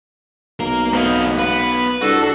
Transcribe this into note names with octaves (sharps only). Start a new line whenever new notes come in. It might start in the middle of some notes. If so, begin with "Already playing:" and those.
B1 A#4 F5
B3 C4 D#5 F5
B4
C2 D4 F#4 A4